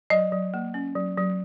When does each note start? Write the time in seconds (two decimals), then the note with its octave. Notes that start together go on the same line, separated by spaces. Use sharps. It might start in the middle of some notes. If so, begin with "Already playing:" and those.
0.10 F#3 D#5
0.32 F#3
0.54 A#3
0.74 C#4
0.96 F#3
1.18 F#3